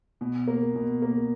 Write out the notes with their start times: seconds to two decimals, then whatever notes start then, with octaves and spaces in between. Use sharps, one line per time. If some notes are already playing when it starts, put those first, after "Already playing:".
0.21 B2
0.47 A#3
0.75 B2
1.02 A#3